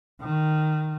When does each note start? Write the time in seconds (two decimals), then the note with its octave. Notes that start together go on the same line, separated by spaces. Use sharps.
0.21 D#3